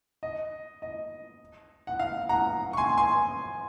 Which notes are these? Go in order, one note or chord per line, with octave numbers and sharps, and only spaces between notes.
D#5
D#5
F#5
F5
F#5 A#5
C#6
G#5 C6
G#5 C6